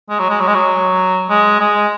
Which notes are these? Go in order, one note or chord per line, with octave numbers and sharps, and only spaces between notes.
G#3
F#3
G#3
F#3
G#3
F#3
G#3
G#3